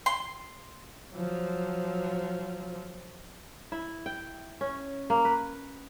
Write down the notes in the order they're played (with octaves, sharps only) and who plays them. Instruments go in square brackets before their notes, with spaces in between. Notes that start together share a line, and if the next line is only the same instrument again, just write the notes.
[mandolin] C6
[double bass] F3 F#3
[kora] E4
G5
C#4
A#3
B4